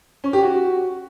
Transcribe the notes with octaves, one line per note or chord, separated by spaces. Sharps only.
C#4
G4
F#4